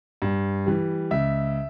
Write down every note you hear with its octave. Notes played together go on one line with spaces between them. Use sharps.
G2
E3 G3
C#2 E5